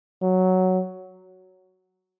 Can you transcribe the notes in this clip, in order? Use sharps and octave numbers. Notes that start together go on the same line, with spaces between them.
F#3